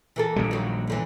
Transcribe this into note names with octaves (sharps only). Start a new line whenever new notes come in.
E3 A#3 A4
A#1 A#2 G3
D#3 F#3
F#2 D3 E3